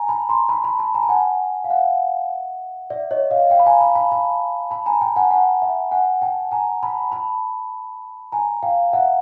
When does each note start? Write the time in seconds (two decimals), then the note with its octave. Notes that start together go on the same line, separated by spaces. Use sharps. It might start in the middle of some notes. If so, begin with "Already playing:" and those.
Already playing: G#5 A#5
0.09 A5 B5
0.29 A#5 C6
0.49 A5 B5
0.64 A5 B5
0.79 A5 B5
0.95 G#5 A#5
1.03 A5
1.09 F#5 G#5
1.64 F5
1.70 E5 F#5
2.90 D5 E5
3.11 C#5 D#5
3.31 D#5 F5
3.50 F5 G5
3.59 B5
3.66 G#5 A#5
3.80 A5 B5
3.95 A5 B5
4.12 A5 B5
4.71 A5 B5
4.86 G#5 A#5
5.01 G5 A5
5.16 F#5 G#5
5.31 F#5 G#5
5.62 E5 F#5
5.91 F#5 G#5
6.22 G5 A5
6.51 G#5 A#5
6.83 A5 B5
7.12 A5 B5
8.32 G#5 A#5
8.63 F5 G5
8.93 E5 F#5